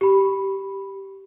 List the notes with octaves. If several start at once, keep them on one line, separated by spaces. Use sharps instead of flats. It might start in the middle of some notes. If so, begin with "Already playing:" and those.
G4 B5